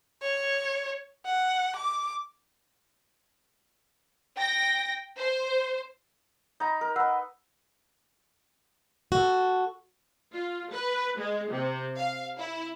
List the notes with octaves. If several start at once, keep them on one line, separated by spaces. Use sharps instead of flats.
C#5
F#5
D6
G5 A#6
C5
D#4 A#5 B5
A#4
B4 D#5 F#5 E6
F#4 A4
F4
B4
G#3
C3
F5
E4